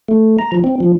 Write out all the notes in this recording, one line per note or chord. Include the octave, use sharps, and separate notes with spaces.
A3
A#5
F3
C4
F3